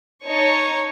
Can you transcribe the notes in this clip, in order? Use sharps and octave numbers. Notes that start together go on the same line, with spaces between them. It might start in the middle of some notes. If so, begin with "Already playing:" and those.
D#4 C#5 A5 C#6